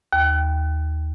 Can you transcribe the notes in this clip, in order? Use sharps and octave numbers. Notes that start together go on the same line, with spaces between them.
D#2